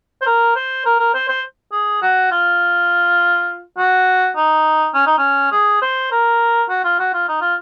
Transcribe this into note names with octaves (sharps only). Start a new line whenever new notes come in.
C5
A#4
C5
A#4
A#4
C5
C5
G#4
F#4
F4
F#4
D#4
C#4
D#4
C#4
G#4
C5
A#4
F#4
F4
F#4
F4
D#4
F4